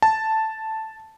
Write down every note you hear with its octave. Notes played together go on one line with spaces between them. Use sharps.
A5